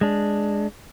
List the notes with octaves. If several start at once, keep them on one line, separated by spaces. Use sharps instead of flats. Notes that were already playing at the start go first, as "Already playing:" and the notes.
G#3 D4